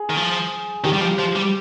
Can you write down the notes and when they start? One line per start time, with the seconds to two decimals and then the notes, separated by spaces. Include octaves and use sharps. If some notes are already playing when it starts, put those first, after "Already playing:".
Already playing: G#4
0.10 D#3
0.16 F3
0.84 D#3 G4
0.93 G3
1.01 F3
1.19 F3
1.35 G3